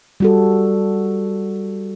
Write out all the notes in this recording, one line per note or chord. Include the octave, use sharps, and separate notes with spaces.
G3 F#4 A4